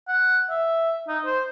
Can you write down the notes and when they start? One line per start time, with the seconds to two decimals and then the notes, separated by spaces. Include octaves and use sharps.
0.08 F#5
0.50 E5
1.08 D#4
1.25 C5